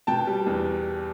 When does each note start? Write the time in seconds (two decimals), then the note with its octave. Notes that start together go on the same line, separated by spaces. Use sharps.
0.07 B2 G5 A5
0.27 G3
0.46 E2